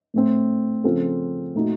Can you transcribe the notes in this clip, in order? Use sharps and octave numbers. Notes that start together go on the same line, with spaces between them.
A2 A3 C4
C#3 F3 C4 F4 A4
A#2 A3 D#4 F#4